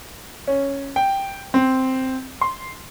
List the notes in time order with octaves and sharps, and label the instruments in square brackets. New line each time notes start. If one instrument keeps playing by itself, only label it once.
[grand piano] C#4
G5
C4
C6